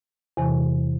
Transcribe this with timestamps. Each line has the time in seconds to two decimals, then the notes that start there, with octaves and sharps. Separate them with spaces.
0.37 E2 C3 E3